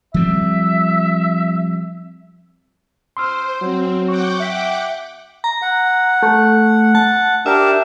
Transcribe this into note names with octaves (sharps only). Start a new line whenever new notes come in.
F3 G3 C4 E5
C5 C6 E6 F6
F#3 C4
F#5 G5 C#6 D6
E5 B6
A#5
F#5
A3
A5
D4 G4 A#4 E5